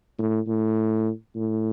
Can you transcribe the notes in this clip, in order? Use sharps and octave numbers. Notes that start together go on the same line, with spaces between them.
A2
A2
A2